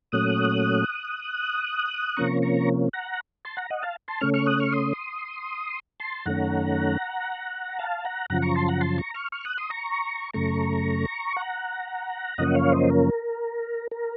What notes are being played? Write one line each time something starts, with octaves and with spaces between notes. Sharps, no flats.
A#2 F#3 A3 C#4 D#6 F#6
C3 F3 A#3 C#4 A#5 C#6
A#5 C#6
F#5 A#5
A5 C6
F#5 A#5
D#5 F#5
F5 A5
A5 C6
C#3 A3 C#4 C#6 F6
C#6 F6
D#6 F#6
C#6 F6
C6 D#6
A5 C6
F#2 D#3 A3 C#4 F#5 A#5
F5 A5
F#5 A#5
F#2 C#3 F3 F#5 A#5
A#5 C#6
A5 C6
F#5 A#5
A5 C6
A#5 C#6
C#6 F6
C#6 F6
D#6 F#6
C6 D#6
A#5 C#6
F#2 C#3 A3 A#5 C#6
F#5 A#5
F#2 C#3 F3 A#3 C#4 D#5 F#5
C#5 F5
C5 D#5
A#4
A#4